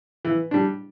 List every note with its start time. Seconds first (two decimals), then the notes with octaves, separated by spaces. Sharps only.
0.25 E3
0.51 G3 D4